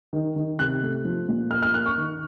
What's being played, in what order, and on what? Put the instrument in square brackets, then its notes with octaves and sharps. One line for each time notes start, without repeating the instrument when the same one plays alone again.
[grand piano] D#3
D#3
C3 F#6
A3
F3
A#2
A#3 F6
F6
A#3 F#6
C#6
D#3